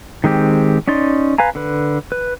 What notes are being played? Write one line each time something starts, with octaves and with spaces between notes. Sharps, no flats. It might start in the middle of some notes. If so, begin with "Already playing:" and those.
D#3 G#3 C4 G4
C#4 D#4 D5 C6
B4 F5 G#5 A#5
D3 B4
B4